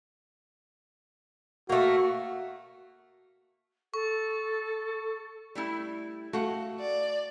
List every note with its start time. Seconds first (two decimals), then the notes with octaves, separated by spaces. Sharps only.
1.69 A3 A#3 F#4
3.94 A4 C#6
5.55 G3 A3 E4
6.33 A3 F#4 F5 F#5
6.81 D5